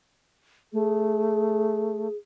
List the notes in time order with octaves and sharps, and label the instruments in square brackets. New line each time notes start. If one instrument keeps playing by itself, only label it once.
[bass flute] A3 [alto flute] G#4